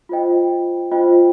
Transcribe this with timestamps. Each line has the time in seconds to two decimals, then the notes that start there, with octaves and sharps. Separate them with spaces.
0.09 F4 C5 D#5 G5
0.91 F4 C5 D#5 G5